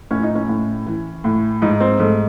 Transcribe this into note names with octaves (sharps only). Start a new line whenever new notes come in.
A2 C#4
D#4
C#4
A2
E3
A2
G#2 D#4
C4
G#2 A3